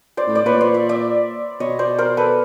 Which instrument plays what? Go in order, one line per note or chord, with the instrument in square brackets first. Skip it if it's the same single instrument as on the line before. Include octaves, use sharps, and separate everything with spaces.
[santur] C5 D5
[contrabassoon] A2
[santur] D5
[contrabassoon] A#2 [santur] B4 C#5
[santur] C5 D5
D5 E5
D5 E5
[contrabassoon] B2 [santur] C#5 D#5
[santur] C5 D5
A#4 C5
A4 B4